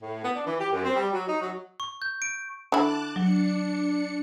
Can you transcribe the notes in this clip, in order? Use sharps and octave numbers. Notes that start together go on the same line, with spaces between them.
A2
B3
D4
E3
G4
F#2
C4
G3
F#3
D#4
F#3
C#6
G6
D7
D3 E4 A5 D6 F#6
F#3 D4 C#7